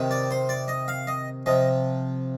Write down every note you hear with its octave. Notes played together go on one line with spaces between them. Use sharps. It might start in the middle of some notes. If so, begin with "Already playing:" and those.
Already playing: C3 D#3
D5
C5
D5
D#5
F5
D#5
C3 F3 D#5